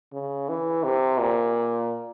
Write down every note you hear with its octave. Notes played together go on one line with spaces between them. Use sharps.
C#3
E3
C3
A#2